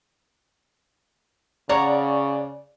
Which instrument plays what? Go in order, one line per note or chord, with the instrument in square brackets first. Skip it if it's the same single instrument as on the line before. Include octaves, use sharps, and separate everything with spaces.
[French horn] C#3 [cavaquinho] C#5 F#5 A#5 [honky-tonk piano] D5